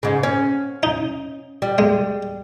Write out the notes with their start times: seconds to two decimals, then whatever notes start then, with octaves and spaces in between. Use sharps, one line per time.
0.03 G#2 C#3
0.23 C#4
0.83 D#4
1.62 G3
1.78 G#3